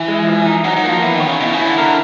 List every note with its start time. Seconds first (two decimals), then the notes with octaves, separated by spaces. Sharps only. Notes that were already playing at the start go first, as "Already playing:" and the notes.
Already playing: E3
0.08 G#3
0.27 F3
0.46 D#4
0.64 F#3 D#4
0.77 F#3
0.84 A#3
0.89 F3
1.02 E3 B3
1.15 D#3
1.20 C#5
1.27 C#3
1.40 B2 E4
1.52 C#3
1.58 E4
1.65 D3
1.78 D3 A#4